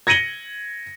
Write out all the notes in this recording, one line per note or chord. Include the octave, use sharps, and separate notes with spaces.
G#6 A#6 C#7 D#7 F#7 G7